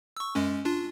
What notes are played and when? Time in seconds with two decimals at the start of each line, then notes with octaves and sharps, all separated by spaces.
0.17 C#6 E6
0.35 F#2 G#3 C#4
0.65 D4 F4